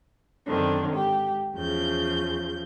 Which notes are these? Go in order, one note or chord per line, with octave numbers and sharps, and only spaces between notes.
F#2 D3 D#3 C4 D4
G#2 G4
E2 C#3 F3 G6